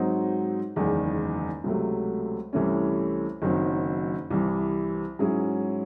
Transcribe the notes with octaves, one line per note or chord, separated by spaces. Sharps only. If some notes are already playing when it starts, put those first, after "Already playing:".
Already playing: G#2 F#3 C4 D#4 F#4
F#1 E2 D#3 G#3
C#2 C3 F#3 A3
C2 C3 E3 A3 C#4
F#1 F#2 D#3 F#3 C4
C2 C3 E3
G#2 F#3 C#4 E4 G#4